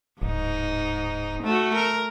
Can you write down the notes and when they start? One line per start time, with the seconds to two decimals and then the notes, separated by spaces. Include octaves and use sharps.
0.22 D1 G#2 D#4
1.43 A3 F#4
1.75 A#4